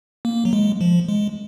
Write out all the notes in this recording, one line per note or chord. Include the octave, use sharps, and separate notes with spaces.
A#3
F#3
G#3
F3
G#3